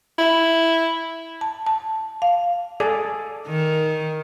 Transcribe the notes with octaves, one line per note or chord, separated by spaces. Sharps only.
E4
A5
A5
F5
G#4 A4 D5
D#3